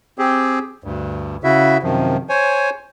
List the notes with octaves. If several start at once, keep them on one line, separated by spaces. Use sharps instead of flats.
C4 G4 G#4
D2 G2
C#3 E4 F#4 E5
F#2 C3 D#3 F3
C5 C#5 G#5